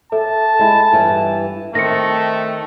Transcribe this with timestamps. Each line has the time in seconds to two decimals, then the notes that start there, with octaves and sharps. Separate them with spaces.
0.12 A4 E5 A5
0.59 G#3 E4
0.93 G2 E3 B3
1.75 D#3 A3 C4 A#6 C#7